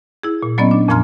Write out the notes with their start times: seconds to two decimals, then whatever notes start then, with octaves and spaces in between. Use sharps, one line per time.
0.23 E4 G#4
0.43 A#2
0.58 F#3 A#3 B3 C#4 D5 D#5
0.71 D4
0.88 F2 A#2 F3 A#5 C6 F6